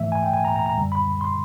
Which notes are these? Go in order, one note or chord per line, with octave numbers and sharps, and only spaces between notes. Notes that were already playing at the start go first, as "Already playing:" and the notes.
Already playing: G#2 E3 A3 E5
G#5
G5
G#5
A#5
A#5
A#5
F#2 D3 G3
B5
C6